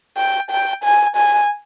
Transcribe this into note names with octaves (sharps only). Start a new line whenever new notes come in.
G5
G5
G#5
G#5